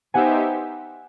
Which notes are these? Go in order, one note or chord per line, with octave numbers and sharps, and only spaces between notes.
B3 D#4 G4 C5 E5 F#5 G#5